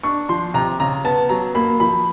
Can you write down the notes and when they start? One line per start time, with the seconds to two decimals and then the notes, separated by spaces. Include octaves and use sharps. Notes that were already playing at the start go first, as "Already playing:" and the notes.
0.03 D4 C#6
0.29 F3 C6
0.54 C3 A#5
0.80 C#3 A#5
1.05 B3 A5
1.29 F#3 A#5
1.55 A#3 B5
1.80 F3 B5